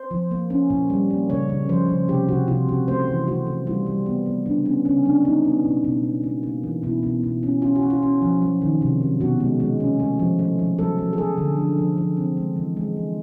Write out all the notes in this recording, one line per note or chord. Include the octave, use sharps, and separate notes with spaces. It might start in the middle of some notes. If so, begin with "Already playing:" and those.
Already playing: C5
F3
A#3
C#4
A#2
G3
A#3
C#3 C#5
C#3
F3 C5
C#3
C3 G4
C3 F#4
C3 F4
C3 F#4
A3 C5
E3
A3 F#4
A3
G3 F4
G3
B3
B3
C#3 D4
B3 C#4
C#3 C#4
F#3 D4
B3 D#4
B3
B2
B2
C#4
A#3
A#3
E3
B2 E4
B2
B2
C#4
C#4 F4
F#4
C#4
F4
C#4
F3
F#3
D#3
C3
F#3
B2 F#4
G#3
G#3
C#4
A3
F3
A3
F3
F#3 A4
F#3
G#4
F#3 A4
D3
F3
F3
F3
C4
G#3
E3
G#3
E3